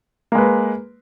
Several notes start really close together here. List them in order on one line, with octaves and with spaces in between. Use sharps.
A#3 G#3 B4